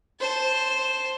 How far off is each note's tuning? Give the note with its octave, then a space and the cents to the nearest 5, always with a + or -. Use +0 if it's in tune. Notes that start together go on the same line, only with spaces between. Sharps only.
C5 +0 A5 +0